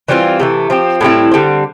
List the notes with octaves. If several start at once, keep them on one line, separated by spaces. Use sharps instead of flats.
E3 G3 C4 F4
C3 E3 A3
F3 C4 G4
A2 G3 C4 E4
D3 G3 C4